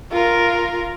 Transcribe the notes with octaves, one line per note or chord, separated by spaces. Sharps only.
F4 A#4